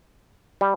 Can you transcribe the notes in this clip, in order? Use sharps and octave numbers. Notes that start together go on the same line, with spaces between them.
G3